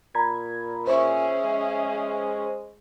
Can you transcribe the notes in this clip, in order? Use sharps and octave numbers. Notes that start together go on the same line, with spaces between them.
A#2 A#5 B5 G#6
C#4 G#4 C5 E5 C#6
G#3